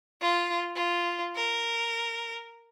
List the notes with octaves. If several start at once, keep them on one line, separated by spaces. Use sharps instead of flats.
F4
F4
A#4